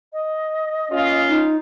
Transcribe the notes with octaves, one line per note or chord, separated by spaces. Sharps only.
D#5
A#3 C#4 F4
D#4